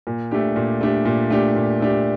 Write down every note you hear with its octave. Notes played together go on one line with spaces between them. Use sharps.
A#2
A3 D4 G4
A#2
A3 D4 G4
A#2
A3 D4 G4
A#2
A3 D4 G4